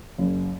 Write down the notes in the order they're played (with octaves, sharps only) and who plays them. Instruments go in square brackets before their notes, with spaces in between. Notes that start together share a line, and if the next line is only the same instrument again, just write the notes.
[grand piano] F#1